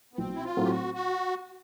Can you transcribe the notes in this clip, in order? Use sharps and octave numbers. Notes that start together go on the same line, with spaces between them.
B3
B1 C4
E4
F4
A2 F#3 A3 C4
G4
F#4
F#4